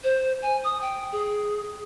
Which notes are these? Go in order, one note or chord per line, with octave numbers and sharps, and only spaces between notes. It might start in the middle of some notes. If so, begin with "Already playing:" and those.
C5
G#5
D#6
G5
G#4